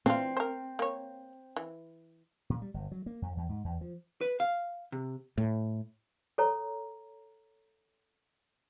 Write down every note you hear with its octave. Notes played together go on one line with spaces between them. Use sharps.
E3 C4 D4 F4
A#4 C5
A#3 C#5
E3
A#2
G3
G1
F#3
A#3
F2
E2
G#2
E2
F3
B4
F5
C3
A2
A4 C#5 A#5